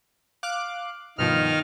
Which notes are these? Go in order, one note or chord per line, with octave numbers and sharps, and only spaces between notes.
F5 D6 F#6
G2 B2 D#3 F3 D#4 F6